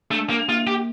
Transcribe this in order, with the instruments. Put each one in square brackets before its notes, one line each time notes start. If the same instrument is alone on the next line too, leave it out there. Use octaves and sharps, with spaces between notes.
[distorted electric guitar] A3 [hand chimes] D4
[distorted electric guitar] A#3
[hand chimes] A#3 [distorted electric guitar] F4
[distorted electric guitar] G4